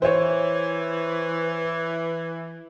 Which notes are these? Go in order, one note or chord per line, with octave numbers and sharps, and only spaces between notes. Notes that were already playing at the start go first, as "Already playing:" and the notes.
E3 C5 C#5